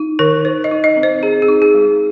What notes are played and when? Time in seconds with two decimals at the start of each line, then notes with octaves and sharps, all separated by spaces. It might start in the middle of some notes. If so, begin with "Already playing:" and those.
Already playing: D#4
0.19 D#3 A#4
0.45 D#4 C5
0.64 D#5
0.71 D#4
0.84 D#5
0.97 C4
1.03 C5
1.23 C4 G#4
1.42 G#4
1.48 D#4
1.62 G#4
1.74 G#3